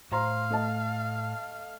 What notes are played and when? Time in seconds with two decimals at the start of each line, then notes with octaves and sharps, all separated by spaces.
0.12 A2 C5 F5 A#5 C6
0.50 A3 D#5 A5